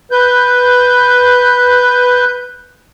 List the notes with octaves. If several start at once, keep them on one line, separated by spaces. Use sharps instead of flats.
B4 G6